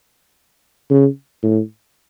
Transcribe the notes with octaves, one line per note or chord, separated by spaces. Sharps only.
C#3
A2